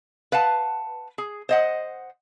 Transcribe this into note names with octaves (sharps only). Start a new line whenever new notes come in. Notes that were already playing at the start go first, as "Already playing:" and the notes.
B4 F5 F#5 A5
G#4
C5 D#5 F#5